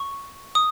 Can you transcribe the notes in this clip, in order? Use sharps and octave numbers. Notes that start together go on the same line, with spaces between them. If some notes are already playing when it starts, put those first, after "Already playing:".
Already playing: C#6
D#6